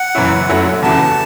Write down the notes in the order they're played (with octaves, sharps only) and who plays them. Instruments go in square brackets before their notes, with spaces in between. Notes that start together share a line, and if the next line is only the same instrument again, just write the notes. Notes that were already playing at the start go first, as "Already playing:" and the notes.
Already playing: [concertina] F#5
[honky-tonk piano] F#1 F#2 E3 C#4 E4
F#2 F#3 A3 C#4 E4
[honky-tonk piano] E2 C#3 E3 A3 F#4 [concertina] A5